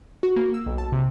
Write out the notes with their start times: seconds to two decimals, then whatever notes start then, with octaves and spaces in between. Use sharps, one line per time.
0.23 F#4
0.36 A#3
0.54 E6
0.66 B1
0.78 A5
0.92 C3